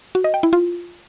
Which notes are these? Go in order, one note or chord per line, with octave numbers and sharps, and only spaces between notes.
F#4
D#5
G5
E4
F4